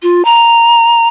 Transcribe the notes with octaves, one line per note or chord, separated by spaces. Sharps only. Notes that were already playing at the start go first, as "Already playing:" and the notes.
F4
A#5